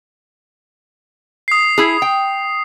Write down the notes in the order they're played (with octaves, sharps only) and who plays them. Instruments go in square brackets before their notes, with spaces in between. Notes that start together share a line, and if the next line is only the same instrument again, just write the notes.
[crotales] D#6 C7
[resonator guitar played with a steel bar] E4 G#4
G5